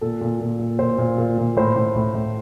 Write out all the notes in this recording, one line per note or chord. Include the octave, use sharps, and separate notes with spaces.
A#2 A4
A#2
A#2
A#2
A#2 C5
A#2
A#2
A#2
A2 C5
A2
A2
A2